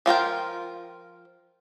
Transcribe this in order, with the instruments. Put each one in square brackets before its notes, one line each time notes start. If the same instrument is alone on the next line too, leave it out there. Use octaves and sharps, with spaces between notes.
[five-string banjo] F3 F4 A#4 G5